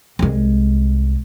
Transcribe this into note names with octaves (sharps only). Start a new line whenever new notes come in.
C2 G#3